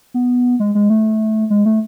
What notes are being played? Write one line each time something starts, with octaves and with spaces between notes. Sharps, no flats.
B3
G#3
G#3
A3
G#3
A3